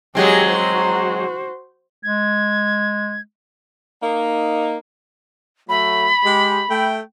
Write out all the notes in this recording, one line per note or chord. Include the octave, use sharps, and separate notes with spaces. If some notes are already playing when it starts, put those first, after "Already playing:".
F#3 G#3 C4 G4 G#5
F#4 C5
G#3 G#6
A#3 D#4
F#3 A3 B5
G#3 G4
A3 G5